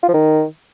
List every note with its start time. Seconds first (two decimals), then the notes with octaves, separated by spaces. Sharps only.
0.03 F4
0.08 F3
0.14 D#3